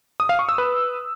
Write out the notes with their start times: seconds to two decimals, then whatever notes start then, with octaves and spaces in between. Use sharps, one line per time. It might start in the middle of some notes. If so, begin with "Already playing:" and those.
0.20 D#6
0.29 F5
0.39 C#6
0.49 E6
0.58 B4